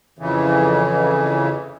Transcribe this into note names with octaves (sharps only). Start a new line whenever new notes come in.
F2 C#3 E3